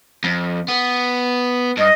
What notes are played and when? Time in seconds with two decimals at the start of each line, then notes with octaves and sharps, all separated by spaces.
0.24 F2
0.68 B3
1.77 G2 D#5